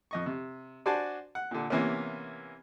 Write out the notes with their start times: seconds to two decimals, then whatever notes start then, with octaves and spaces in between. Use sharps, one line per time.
0.11 F2 D#5 C#6
0.26 C3
0.86 D4 F#4 C5 D5 G#5 A5
1.35 F#5
1.51 A#2 D3
1.70 C3 E3 A#3 B3 C#4